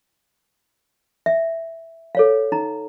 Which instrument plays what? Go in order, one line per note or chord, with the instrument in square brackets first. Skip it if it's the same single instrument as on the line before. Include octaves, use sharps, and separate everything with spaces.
[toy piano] E5
A4 C#5 F5
D#4 A#5